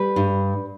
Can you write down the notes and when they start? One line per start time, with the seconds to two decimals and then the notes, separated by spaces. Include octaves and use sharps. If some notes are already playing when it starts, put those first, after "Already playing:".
Already playing: G3 B4
0.16 G2